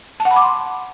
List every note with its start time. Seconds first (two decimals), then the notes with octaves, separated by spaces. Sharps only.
0.20 A5
0.25 F#5
0.31 B5
0.36 D6
0.42 C6